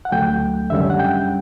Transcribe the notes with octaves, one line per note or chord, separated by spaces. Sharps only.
F#5
D2 D3 F#3 A3 G5
F#2 D3 G3 C#4 E5
F#5
G5